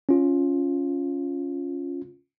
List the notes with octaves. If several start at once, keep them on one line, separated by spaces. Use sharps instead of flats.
C#4 F4